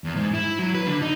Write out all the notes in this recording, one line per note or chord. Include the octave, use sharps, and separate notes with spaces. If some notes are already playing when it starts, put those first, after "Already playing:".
E2
G#2
E4
F#3
B4
D3
D#4